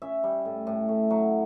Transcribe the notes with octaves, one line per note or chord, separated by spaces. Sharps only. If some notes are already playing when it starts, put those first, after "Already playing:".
C#4 E5
G3
A2
A2
A3
F#3